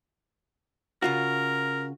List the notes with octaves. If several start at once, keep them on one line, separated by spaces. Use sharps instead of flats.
C#3 F4 F#4 A#4